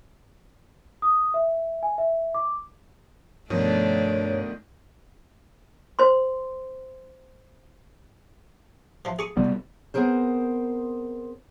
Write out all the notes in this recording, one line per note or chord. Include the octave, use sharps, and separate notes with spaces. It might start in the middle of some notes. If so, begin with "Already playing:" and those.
D#6
E5
G#5
E5
D6
G2 B2 D#3 F3 A3 D4 C#5
C5 C6
E3 F3
G#4 C#6 D#6
C3 G3 B3
B3 C4 G#4 A#4 C5